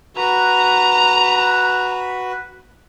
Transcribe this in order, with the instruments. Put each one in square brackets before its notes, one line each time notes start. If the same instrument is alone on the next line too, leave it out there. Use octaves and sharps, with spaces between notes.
[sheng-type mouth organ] F#4 B4 [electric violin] A#5